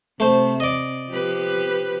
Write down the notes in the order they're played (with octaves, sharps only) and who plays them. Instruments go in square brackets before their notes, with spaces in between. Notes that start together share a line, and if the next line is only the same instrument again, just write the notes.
[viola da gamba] C3 [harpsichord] A3 C5
[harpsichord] D5 D#5
[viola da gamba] F3 G4 B4